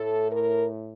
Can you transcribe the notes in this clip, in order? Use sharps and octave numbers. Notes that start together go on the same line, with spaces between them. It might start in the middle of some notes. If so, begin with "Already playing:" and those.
Already playing: A2 A4
A#4